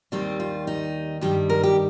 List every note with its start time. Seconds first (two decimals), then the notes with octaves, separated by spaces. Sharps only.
0.12 D#2 D#3 G3 C4
0.40 F4
0.67 D#4
1.21 G2 D#3 G3 G4
1.50 A#4
1.63 G4